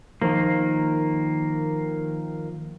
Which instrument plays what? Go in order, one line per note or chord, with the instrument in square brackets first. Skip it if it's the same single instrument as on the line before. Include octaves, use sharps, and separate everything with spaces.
[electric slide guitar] D#3 A#3 [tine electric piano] F3 F4